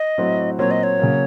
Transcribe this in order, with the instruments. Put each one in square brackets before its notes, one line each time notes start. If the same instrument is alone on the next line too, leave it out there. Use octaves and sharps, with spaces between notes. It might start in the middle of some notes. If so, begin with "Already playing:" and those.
Already playing: [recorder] D#5
[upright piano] A2 F#3 C4 F#4
[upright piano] A#2 F#3 C4 F#4 [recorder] C#5
[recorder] D#5
C#5
[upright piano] C#3 F#3 A#3